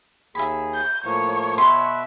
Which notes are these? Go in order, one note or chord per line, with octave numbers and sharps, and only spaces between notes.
D#2 G#4 E5 B5
G6
A2 F3 A#3 C#5
B2 B4 E5 C6